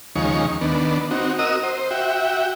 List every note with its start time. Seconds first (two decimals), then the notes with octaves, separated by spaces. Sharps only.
0.16 D#2 C#3 F3 G#3 D#4 C#6
0.61 D#3 B3 D4
1.11 C4 D#4 F#4
1.39 F#4 A#4 D#5 D#6 E6
1.63 C5
1.91 F#4 E5 G5